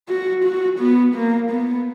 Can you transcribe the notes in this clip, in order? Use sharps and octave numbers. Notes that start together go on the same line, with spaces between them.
F#4
F#4
B3
A#3
B3